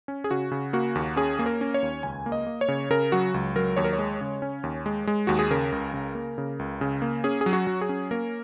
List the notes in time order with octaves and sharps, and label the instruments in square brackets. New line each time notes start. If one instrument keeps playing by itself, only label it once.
[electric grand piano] C#4
G#4
C#3 F#4
C#3
A#3 F#4
D#2
C#4 G#4
A#3
A#4
C#4
C#5
D#2
C#2 G#5
A#3
D#5
A#3
C#5
C#3
C#3 A#4
F#3 F#4
C#2
F#3 A#4
D#2 C#5
A#4
C#5
G#3
C#3
C#4
D#2
G#3
G#3
D#2 F#4
G#4
C#3 A#4
C#2
C#3
A#3
C#3
C#2
C#3
A#3
C#4 G#4
G#4
F#3
F#4
F#3
G#4
C#4
A#3 A#4